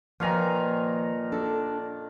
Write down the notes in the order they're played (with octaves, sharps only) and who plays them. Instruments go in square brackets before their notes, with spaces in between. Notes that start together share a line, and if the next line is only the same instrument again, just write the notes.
[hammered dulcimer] A#2 D#3 A#5 [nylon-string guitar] F3 B4 G#5
[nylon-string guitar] D4 A4